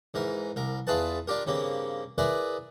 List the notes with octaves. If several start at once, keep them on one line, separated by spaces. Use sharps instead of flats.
G#2 E3 A#4
C2 A#4
E2 E4 F4 G#4 B4 A5
D4 F4 G4 A#4
G2 C#3 A#3 C4
E4 G#4 A#4 B4 D5 E5